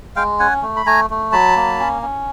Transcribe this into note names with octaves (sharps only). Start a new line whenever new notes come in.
G#3 F5 G5
C#4 F#5 G#5
A3
B5
A3 G#5 A#5
A3
F#3 A5 B5
A#3
C#4
C#4